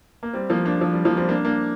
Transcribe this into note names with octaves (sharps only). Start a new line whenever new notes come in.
A#3
G3 C4
F3 A#3
A#3 D4
F3
G3
F3 A#3
G3 C4
A#3 D4
A#3 D4